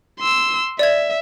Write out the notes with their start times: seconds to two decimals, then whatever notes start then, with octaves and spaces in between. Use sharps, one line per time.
0.20 C6 E6
0.79 D5 E5 G#6